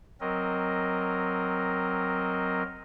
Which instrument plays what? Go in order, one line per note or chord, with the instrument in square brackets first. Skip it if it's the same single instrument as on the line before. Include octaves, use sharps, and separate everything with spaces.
[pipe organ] F#3 C4 A#4 D#5